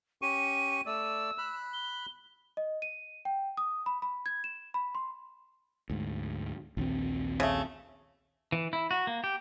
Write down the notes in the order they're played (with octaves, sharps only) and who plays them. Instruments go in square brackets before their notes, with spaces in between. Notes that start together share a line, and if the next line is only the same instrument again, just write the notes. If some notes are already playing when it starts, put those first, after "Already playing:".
[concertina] C#4 G4 C#6 [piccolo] D#7
[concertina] A3 D5 [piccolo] E6
[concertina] B5 F#6
[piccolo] G7
[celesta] D#5
D#7
G5
D#6
B5
B5
G#6
E7
B5
C6
[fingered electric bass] D2 G#2
A#1 D#2 C4
[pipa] C#3 A3
[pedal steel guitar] E3
E4
F#4
A#3
G4